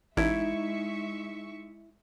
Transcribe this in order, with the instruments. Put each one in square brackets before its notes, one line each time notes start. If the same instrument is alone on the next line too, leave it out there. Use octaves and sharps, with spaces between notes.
[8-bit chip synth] A1 [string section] G#3 E5 C#6 [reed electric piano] D#4 [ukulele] E4